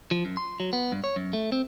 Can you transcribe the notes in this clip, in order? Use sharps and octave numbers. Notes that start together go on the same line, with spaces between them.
F3
F#2
C6
F#3
B3
G2
C#5
F#2
A3
C4